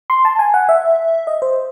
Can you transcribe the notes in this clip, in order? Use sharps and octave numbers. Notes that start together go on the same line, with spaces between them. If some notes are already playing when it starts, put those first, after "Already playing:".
C6
A5
G#5
F#5
E5
D#5
C5